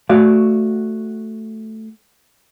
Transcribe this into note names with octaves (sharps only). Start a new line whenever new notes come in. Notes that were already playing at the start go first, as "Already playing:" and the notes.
A3 F#4 D5 F5